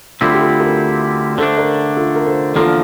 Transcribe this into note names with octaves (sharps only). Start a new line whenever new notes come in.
D2 D3 G3 C4 E4 F4 A4
G4
F4 A4
G4 A#4
D3 A3 D4 A4 C5
A#4 D5
F4 A4
A#4
A4 C5
E2 D3 F3 A#3 F4 A4